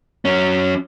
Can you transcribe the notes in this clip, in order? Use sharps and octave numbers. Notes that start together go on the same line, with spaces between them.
F#3 C#4